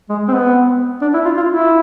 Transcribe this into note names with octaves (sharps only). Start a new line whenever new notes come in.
G#3
C4
B3
D4
E4
F4
F4
E4